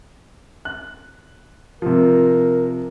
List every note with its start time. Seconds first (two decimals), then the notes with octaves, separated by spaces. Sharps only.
0.65 F#6
1.82 C3 F3 A#4